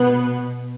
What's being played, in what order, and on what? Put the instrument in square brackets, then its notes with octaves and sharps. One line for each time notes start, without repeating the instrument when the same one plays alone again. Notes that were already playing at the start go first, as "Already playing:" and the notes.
Already playing: [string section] B2 B3